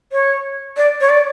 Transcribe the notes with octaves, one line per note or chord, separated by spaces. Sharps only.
C#5
D5
C#5
D5